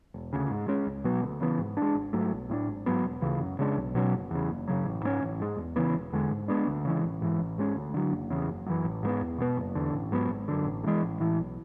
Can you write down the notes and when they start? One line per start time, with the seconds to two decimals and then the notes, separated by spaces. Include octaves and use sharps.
0.14 E1
0.33 D2 C#3
0.50 G#2
0.68 G#3 C#4
0.86 C#2
1.04 B2 F#3 B3
1.23 D2
1.41 C#3 E3 B3
1.59 G#2
1.77 G#3 D4
1.95 G#1
2.13 G#2 F#3 A3
2.32 B1
2.49 A2 G#3 D4
2.67 G#1
2.86 G#2 F#3 B3
3.05 E1
3.22 D2 C#3 E3
3.40 F#2
3.59 C#3 G#3 D4
3.77 B1
3.95 B2 F#3 C#4
4.13 F#1
4.31 E2 C#3
4.49 F#1
4.68 F#2 C#3 F#3
4.85 A1
5.03 G#2 G#3 C#4
5.22 A1
5.40 G#2 G#3
5.58 E2
5.76 C#3 E3 B3
5.94 E1
6.12 E2 D3 G#3
6.30 G#2
6.48 G#3 B3 D4
6.67 D2
6.85 C#3 E3 G#3
7.04 A1
7.22 G#2 E3
7.39 A1
7.58 G#2 G#3 C#4
7.76 D2
7.94 D3 F#3
8.11 F#1
8.30 E2 C#3
8.49 F#1
8.67 F#2 E3
8.85 A1
9.03 G#2 E3 B3
9.21 E2
9.38 B2 G#3 B3
9.57 F#1
9.75 E2 D3
9.93 A1
10.12 G#2 F#3 B3
10.30 G#1
10.48 F#2 D3
10.65 A1
10.83 G#2
10.86 E3 G#3
11.02 A1
11.20 A2 E3
11.39 B1